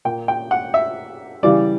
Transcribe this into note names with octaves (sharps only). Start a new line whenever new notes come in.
A#2 A#3 G5
G5
F#5
E5
C#3 E3 G3 D5